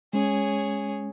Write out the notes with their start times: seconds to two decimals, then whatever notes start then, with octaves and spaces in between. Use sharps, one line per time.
0.13 G#3 C#4 G#4 C#5